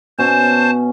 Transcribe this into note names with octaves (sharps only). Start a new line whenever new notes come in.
B2 C#4 C5 A5